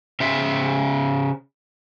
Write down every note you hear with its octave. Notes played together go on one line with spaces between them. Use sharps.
C#3 C5 E5